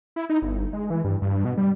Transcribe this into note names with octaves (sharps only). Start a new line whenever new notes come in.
E4
D#4
G1
G#3
E3
G2
G2
B2
G3